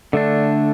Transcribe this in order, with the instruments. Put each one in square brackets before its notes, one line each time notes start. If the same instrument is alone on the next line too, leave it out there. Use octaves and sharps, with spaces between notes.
[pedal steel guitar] D3 A3 D4